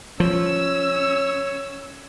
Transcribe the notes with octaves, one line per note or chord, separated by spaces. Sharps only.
F3 C#4 C#5 E6